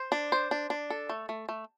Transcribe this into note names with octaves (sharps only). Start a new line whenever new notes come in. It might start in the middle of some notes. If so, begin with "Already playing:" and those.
Already playing: C5
D4
C5
D4
D4
A4
A3
A3
A3